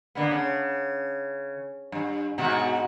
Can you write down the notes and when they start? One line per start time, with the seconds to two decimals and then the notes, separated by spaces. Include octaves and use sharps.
0.15 D3 A#3 B3
0.31 C#3
1.92 G2
2.38 G#2 B2 F#4